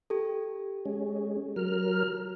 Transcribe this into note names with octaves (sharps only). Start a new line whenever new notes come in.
G4 A4
G#3 C#4
F#3 A#4 F6